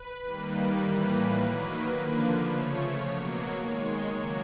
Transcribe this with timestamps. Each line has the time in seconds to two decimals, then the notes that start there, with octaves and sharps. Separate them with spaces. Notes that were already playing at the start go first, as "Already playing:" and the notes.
Already playing: B4
0.22 D#3 G3 A#3
0.76 A2 E3 G3 A#3 B4
1.31 D#3 F#3 A#3 B4
1.86 D3 F3 A#3
2.41 C#3 F3 A3 C#5
2.97 B2 F#3 A#3
3.52 D#3 G#3
4.06 C#3 F#3 A#3